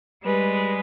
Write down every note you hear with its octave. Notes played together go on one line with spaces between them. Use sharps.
G3 G#3 B4